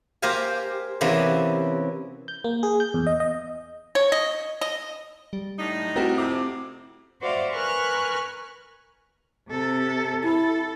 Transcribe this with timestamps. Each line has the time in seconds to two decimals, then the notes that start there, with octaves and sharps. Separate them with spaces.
0.22 A#3 G4 A#4 C5 F5 G#5
1.01 C3 E3 A#3 B3 C#4
2.28 G6
2.44 A#3
2.63 G#4
2.80 G6
2.94 E2
3.07 D#5
3.20 D#5
3.95 C#5
4.12 D#5
4.61 D#5
5.33 G3
5.59 A2 D4 D#4
5.96 A3 C4 E4 F#4 G4 A#4 F#5
6.18 F2 C3 D6
7.21 F#4 C5 D5 E5 F5
7.51 A#4 B4 G#5 C#6 F6 F#6
9.49 C3 A4
10.23 E4 A4